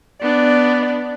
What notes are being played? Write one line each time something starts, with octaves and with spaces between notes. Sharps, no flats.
B3 D4 D5